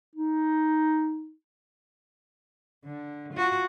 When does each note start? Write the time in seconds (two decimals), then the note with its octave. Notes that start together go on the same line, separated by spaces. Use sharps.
0.15 D#4
2.84 D3
3.33 F4 F#4